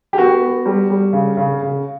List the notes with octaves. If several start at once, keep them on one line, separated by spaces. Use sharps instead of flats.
G4
B3 F#4
B3
G3
G3
C#3
C#3
C#3